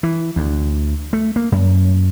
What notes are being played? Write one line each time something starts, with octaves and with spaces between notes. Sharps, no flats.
E3
D2
A3
A#3
F#2